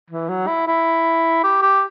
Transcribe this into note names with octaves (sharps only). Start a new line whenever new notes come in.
E3
F#3
E4
E4
G4
G4